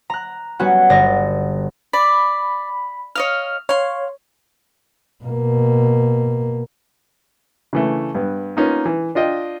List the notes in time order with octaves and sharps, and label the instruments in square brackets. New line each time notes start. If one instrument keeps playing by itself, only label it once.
[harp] A#5 F#6
G3 B3 C#4 F#4
G1 D5 A#6
[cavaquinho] D5 [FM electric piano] B5
[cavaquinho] C#5 D#5 F5 [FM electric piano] F6
[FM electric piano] C#5 [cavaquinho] F5 C6
[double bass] B2 A#3
[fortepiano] C#3 E3 A3
G2 B3
A#3 B3 C#4 D#4 F4
E3
D4 F4 D#5 G5